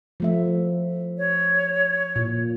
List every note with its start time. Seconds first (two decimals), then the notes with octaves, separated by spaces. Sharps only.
0.20 F3 A3 E5
1.18 C#5
2.16 A#2